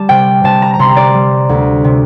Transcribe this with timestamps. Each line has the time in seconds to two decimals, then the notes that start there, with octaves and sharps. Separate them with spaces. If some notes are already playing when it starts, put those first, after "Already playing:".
Already playing: G3 A5
0.09 C3 G5
0.44 C3 A5
0.62 A#5
0.74 A#5
0.79 C3 C6
0.97 D5
1.14 G3
1.49 D2
1.84 C3